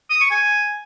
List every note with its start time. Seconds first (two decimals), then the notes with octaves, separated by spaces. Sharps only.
0.10 D#6
0.21 C#6
0.31 G#5